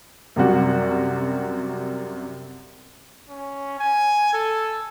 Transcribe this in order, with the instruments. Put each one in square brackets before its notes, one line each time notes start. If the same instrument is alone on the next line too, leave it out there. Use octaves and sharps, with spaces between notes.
[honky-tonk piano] F#2 C3 G3 F#4
[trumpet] C#4
G#5
A4